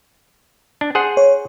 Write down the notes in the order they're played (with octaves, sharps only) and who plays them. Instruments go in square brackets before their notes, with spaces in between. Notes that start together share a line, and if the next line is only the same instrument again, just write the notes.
[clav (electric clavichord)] D4
G#4 C5 F#5
[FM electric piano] C#5